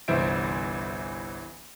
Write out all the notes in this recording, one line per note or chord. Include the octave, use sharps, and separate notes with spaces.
G1 C2 E3 C5 E5 D7